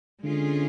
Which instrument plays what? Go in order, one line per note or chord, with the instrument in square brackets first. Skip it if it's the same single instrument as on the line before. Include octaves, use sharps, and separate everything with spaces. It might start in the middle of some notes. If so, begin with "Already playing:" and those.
[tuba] D3 [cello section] G#3 C#4 F4 G#4